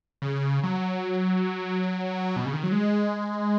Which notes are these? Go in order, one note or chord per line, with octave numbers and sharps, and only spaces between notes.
C#3
F#3
B2
C#3
D#3
F#3
G#3